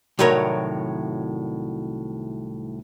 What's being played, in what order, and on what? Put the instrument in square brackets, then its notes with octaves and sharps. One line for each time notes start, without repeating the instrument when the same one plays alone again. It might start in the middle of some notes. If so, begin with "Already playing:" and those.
[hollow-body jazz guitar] C2 A2 D#3 F#3 A#4 C#5